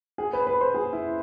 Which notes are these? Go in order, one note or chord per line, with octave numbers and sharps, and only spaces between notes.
G#4
B4
B4
C5
G#4
E4